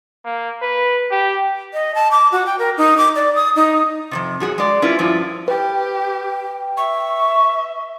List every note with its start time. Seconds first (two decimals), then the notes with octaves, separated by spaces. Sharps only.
0.25 A#3
0.62 B4
1.11 G4
1.73 D#5
1.95 A5
2.11 D6
2.32 F#4
2.46 G5
2.59 A#4
2.78 D#4
2.98 D6
3.16 D5
3.36 D#6
3.56 D#4
4.11 F2 G#2 C3
4.40 F#2 F#4 G#4
4.58 G#3 D5
4.82 C#4 E4 F4 A#4 B4
4.99 G2 F3 E4 F4
5.48 G4 B4 G5
6.77 E5 C#6